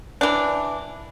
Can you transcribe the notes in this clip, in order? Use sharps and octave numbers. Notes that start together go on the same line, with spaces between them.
E3 D4